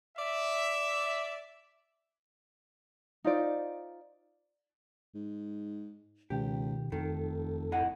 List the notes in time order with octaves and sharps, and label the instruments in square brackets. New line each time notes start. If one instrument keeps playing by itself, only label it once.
[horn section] D5 E5
[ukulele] D#4 F4 C5 D5
[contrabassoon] G#2
[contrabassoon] C#2 [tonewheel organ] B2 D#3 [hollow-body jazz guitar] G4
[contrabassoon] F1 [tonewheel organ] F2 A4 [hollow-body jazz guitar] D#3
[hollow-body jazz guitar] A2 D#5 F#5